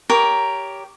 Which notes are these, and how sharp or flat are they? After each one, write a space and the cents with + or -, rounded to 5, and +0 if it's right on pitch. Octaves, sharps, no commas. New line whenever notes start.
G4 +0 A#4 +0 C#5 +20